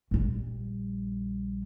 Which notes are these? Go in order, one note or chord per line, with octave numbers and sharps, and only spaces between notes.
A#1 G3